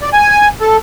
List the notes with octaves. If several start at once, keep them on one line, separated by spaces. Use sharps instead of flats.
D5
G#5
A4